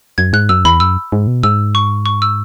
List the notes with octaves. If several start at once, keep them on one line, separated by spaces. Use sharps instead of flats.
F#2 G#6
G#2 F#6
F#2 E6
E2 B5
F#2 E6
G#2
B2
G#2 E6
C#6
C#6
E6